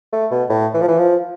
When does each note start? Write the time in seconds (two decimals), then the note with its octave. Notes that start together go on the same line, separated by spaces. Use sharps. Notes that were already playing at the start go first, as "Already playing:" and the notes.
0.13 A3
0.31 B2
0.50 A2
0.74 E3
0.82 F3
0.88 E3
0.99 F3